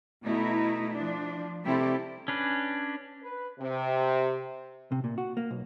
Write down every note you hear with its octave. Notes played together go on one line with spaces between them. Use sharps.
B2 A3 D#4 E4
F3 D4
C3 G3 A3 E4 G4 A4
C#4 D4 B4
B4
C3
C3
A#2
F#4
A#3
B1